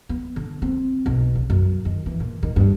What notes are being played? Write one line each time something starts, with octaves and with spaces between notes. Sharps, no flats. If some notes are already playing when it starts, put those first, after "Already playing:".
B3
D3
C4
B1
C#3
F#2
D#3
E3
A#2
D#3
G2